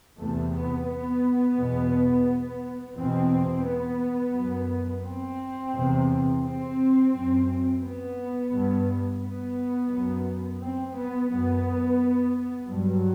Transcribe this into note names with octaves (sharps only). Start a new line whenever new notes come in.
E2 C3 A3
B3
B3
E2 B2
E2 B2 C4
B3
F#2
C4
E2 C3
C4
F#2
B3
G2
B3
F#2
C4
B3
F#2 B3
G2 F#3